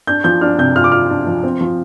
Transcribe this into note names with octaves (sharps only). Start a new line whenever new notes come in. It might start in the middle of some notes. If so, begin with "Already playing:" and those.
D4 G6
F3 G6
D4 F6
C3 G6
F4 F6
D6
F4 F6
D4
F3
C4
F3